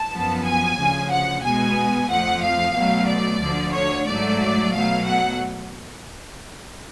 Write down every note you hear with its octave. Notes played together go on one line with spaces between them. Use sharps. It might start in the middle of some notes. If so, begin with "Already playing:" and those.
Already playing: A5
F#2 F3 B3
G#5
D2 C#3 F3
F#5
B2 G#3 B3 G#5
F2 F3 A3 F#5
F5
B2 F#3 A3
D5
D2 D3 F3
C#5
G#2 F#3 A3 D5
B2 F#3 A3 F5
F#5